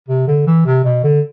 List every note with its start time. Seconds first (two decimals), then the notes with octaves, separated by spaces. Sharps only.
0.08 C3
0.27 D3
0.47 E3
0.65 C3
0.84 B2
1.03 D3